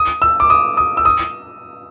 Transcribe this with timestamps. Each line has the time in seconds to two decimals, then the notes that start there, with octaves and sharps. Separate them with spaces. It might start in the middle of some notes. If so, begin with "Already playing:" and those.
Already playing: D#6
0.22 E6
0.40 D6
0.50 D#6
0.77 D#6
0.97 E6
1.05 D#6